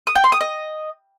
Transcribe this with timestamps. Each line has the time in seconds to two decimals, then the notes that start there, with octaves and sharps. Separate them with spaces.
0.07 D#6
0.15 G5
0.24 C6
0.32 D#6
0.41 D#5